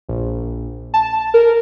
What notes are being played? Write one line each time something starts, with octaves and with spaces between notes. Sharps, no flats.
A#1
A5
A#4